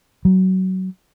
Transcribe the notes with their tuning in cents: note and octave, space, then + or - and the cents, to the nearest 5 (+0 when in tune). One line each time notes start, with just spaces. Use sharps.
F#3 +20